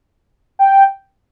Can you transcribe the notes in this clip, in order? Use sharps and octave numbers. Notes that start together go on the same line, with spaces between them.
G5